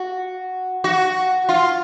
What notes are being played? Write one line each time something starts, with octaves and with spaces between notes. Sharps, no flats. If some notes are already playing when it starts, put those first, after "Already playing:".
Already playing: F#4
F#4
F4